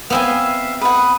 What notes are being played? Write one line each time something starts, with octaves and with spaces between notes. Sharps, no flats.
B3 C4 E5 F5 G#5
B4 F#5 D#6